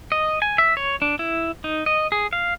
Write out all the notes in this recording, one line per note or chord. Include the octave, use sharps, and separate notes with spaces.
D#5
G#5
E5
C#5
D4
E4
D#4
D#5
G#4
F5